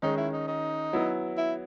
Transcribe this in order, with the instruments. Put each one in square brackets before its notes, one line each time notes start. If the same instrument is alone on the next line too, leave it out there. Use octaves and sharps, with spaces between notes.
[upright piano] D#3 G#3 C#4 [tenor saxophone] D#4
[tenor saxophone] E4
D#4
D#4
[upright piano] F#3 B3 E4
[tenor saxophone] E4